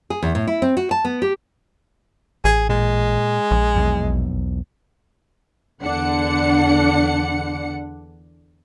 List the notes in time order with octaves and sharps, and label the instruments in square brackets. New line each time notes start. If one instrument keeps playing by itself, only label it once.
[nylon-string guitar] G#4
E2
A2
E4
C4
F#4
A5
B3
G4
[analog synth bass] A1 [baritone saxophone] G#4
[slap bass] A#2 [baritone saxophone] G#3
[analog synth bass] A#1
[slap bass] B1 E2
[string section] E2 D3 D4 F#5 C#7